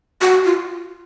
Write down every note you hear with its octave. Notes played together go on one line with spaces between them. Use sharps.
F#4
F4